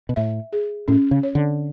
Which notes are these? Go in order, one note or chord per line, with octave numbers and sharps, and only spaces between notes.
B2
A2 E5
G#4
A2 C#4
C#3
C#5
D3